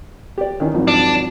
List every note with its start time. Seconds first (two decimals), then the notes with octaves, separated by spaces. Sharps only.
0.38 G4 D5
0.60 D#3 E3 C#4 D#4
0.74 G#1 F3 F#3
0.88 D4